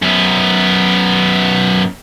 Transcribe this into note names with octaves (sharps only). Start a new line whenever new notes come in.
F#2 B3